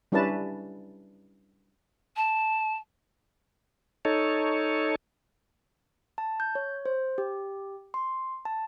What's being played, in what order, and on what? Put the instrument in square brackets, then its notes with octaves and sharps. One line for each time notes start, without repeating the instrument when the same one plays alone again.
[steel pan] G3 C#4 D4 E4 B4 A5
[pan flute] A5
[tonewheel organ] D#4 A4 C#5
[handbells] A5
G6
C#5
C5
G4
C6
A5